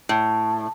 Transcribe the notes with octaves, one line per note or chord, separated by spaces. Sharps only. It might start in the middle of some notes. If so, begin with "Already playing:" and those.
A2